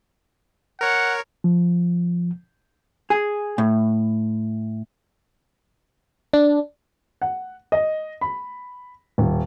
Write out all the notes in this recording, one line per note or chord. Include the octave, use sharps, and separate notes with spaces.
A#4 C#5 F#5
F3
G#4
A2
D4
F#5
D#5
B5
D#1